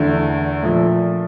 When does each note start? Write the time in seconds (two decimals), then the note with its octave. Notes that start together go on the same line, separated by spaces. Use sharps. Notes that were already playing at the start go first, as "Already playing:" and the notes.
Already playing: E2 D3 A3 E4
0.62 A#2 F3 A3